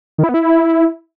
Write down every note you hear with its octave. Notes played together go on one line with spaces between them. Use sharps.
D#3
E4
B3
E4